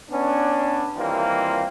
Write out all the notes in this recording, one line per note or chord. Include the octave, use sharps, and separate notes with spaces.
B3 C#4 D4
D#3 E3 G3 A#3 C4 F4